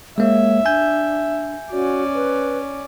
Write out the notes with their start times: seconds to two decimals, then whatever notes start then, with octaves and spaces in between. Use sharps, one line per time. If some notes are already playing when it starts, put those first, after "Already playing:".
0.18 G#3 A#3 C#5 E5
0.66 D4 G#5 G6
1.71 C#4 F#4 D5
2.14 B4